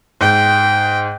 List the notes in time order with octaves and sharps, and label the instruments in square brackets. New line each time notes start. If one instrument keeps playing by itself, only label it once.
[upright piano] G#2 G6 [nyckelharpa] G5